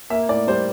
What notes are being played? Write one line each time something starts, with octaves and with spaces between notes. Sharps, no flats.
A#3 E5
A2 D5
G3 C5